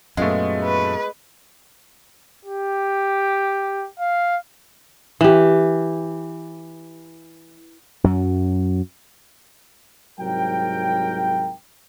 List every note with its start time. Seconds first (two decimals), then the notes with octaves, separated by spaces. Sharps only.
0.17 F#2 A#2 G#3 A3 B3 F4
0.64 B4
2.45 G4
3.99 F5
5.21 E3 G4
8.04 F#2 F#3
10.19 C2 G#2 F#3 A#4 G5